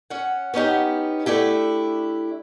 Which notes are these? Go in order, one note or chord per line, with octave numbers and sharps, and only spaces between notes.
C#4 F#5
B3 C#4 D#4 G4
A3 D4 E4 G4